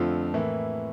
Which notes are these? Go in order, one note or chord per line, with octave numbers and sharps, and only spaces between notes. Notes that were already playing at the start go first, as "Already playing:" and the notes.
Already playing: F2 D3 A3 C4 F4
A2 E3 A#3 E4